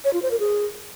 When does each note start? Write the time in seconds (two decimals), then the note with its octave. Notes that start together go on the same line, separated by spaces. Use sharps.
0.05 C#5
0.13 F4
0.22 C5
0.31 A#4
0.40 G#4